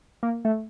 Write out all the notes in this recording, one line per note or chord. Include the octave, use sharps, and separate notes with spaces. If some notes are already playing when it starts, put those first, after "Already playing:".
A#3
A3